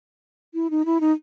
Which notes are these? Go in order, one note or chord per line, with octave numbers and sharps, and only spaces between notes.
E4
D#4
E4
D#4